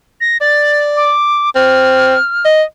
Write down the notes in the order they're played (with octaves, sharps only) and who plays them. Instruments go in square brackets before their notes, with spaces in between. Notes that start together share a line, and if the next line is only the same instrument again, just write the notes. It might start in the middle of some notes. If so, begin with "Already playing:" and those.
[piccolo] A#6
[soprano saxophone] D5 [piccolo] A6
[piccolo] D6
[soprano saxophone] C4 [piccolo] F6
[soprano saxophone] D#5